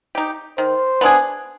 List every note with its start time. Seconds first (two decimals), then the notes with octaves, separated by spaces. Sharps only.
0.15 D#4 G4
0.58 D#3 C5
1.01 B3 D4 G#4